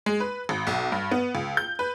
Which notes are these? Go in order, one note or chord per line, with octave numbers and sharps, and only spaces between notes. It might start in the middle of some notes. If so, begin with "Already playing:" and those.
G#3
B4
G#1
B1
G2
B3
C#2
G6
B4